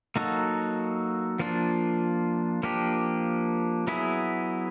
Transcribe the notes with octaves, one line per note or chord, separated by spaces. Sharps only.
F#3 A#3 D#4 F#4 A4
F3 A#3 D4 F4
F3 A#3 D4 G4
F#3 B3 E4 G#4